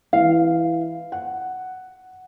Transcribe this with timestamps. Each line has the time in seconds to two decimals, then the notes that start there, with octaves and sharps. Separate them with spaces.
0.13 E3 F5
1.12 F#5